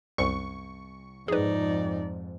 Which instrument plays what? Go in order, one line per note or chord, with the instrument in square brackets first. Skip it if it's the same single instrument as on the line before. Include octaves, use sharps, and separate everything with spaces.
[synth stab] C2 C#6 [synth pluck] F#2
[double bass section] F2 G#2 [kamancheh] D#4 D5 [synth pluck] G#4 B4